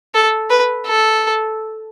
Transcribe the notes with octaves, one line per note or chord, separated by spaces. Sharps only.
A4
B4
A4